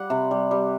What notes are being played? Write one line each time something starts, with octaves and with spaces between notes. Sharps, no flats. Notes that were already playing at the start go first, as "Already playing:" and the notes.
Already playing: G3 F#5
C3
G3
G3